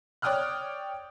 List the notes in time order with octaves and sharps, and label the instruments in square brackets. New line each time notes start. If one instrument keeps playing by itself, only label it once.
[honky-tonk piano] C#5 D5 G5 D#6 F6 F#6